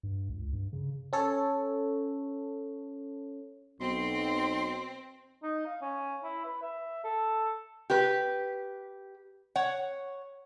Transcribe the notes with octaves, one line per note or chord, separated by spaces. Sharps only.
G2
C#2
G2
C#3
C#4 A4 C#5
B1 B2 C4 C6
D#4
F5
C#4
E4
B4
E5
A4
G4 B4
C#5 F#5